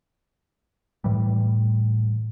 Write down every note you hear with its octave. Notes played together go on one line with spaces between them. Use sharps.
A2 E3 G3